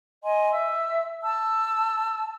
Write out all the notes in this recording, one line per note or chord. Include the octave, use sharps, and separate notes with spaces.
D#5 G#5 C6
E5 E6
A5 E6